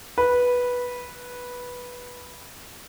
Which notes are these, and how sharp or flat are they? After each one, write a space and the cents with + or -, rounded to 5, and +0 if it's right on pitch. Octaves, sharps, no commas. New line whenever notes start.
B4 -10